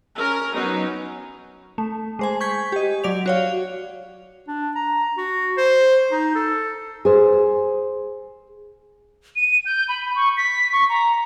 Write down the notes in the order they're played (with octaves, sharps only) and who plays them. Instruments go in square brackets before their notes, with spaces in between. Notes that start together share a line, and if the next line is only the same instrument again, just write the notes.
[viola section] C#4 A#4
F#3 B3 C#4 D#4
[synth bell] A3
G#3 C5 G#5
C#6 G6 G#6 B6
G4 D#5
F#3 D5 F7
F#4 C#5 F5
[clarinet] D4
A#5
F#4
C5
D#4
A4
[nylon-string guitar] G#4 C5
[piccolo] D#7
G6
B5
C#6
B6
C#6
A#5